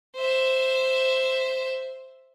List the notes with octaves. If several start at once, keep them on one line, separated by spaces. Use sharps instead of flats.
C5 E5